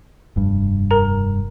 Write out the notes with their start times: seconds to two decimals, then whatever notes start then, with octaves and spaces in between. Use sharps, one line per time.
0.36 F1 G2
0.91 A#4 A#5